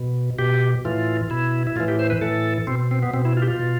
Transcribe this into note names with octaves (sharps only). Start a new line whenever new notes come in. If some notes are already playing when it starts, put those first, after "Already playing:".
Already playing: B2
B2 G4
A2 E3 F4
B2 E4
E4
A2 E3 F4
G4
C5
B4
A2 E3 A4
B2 C4
C4
B3
B2 C4
E4
F4
G4
F4
B2